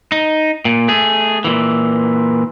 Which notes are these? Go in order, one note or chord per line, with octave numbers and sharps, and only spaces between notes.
D#4
A#2
A3 G#4
A#2 E3